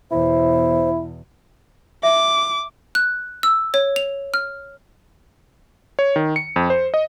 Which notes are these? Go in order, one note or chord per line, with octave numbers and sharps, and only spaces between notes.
E2 B2 E4 C5
E5 D6
F#6
E6
C#5
F7
F6
C#5
D#3
C#7
F2
C5
D#5